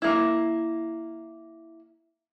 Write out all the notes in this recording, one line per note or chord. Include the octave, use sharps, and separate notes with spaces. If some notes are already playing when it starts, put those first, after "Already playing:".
A#3 E4